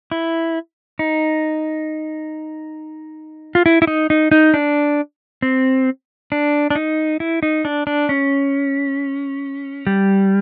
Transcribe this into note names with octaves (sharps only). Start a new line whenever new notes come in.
E4
D#4
F4
E4
E4
D#4
D#4
D#4
D4
C4
D4
D4
D#4
E4
D#4
D4
D4
C#4
G3